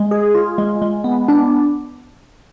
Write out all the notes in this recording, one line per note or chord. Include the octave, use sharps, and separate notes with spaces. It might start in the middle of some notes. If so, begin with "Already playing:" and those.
Already playing: G#3
G#4
F4
G#3
G#3
B3
D4